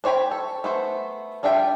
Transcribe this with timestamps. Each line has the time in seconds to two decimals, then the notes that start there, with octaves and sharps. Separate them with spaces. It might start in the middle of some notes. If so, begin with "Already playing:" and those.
0.04 D4 C5 C#5 G5 B5
0.31 A4
0.64 A3 B3 C5
1.43 G3 D4 F4 E5 G5